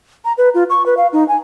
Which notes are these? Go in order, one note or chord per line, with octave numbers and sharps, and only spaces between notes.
A#5
B4
F4
C#6
B4
F5
D#4
G#5